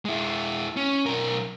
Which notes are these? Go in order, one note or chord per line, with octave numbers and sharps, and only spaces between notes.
G#3 E4
C#4
B1 A#4